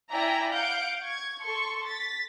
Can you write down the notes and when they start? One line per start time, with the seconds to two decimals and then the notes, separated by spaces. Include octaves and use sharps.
0.10 E4 D5 E5 G5 G#5 A#5
0.52 F5 F#5 G6 D7
1.02 C#6 G#6
1.41 A4 C6 C#6
1.85 A6 B6